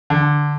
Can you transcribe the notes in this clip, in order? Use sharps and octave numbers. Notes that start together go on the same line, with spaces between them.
D3